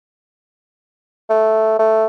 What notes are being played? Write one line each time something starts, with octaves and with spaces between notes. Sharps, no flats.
A3
A3